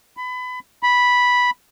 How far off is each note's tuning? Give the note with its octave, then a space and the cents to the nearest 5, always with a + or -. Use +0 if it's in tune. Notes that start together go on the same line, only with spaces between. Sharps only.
B5 +25
B5 -5